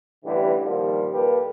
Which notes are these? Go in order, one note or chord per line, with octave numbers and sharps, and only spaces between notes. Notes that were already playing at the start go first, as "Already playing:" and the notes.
A1 G2 D3 E3 G4
A#2 D#3 F3 G3
A#2 A#3 G4 A4 B4